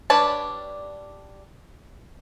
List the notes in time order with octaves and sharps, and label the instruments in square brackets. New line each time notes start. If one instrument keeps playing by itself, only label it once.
[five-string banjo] G3 D4 B4 C#5 A5